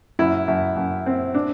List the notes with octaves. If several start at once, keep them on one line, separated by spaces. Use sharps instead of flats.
F#2 E4
F#2
F#2
C4
D4